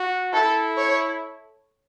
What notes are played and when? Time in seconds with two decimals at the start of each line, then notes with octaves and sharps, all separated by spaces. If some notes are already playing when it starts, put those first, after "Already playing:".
Already playing: F#4
0.33 E4 A4
0.78 C#5